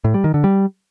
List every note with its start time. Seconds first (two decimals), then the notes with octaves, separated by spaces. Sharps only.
0.04 A2
0.14 G3
0.24 D#3
0.34 D3
0.44 G3